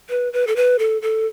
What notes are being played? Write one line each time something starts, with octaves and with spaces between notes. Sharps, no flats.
B4
B4
A4
B4
A4
A4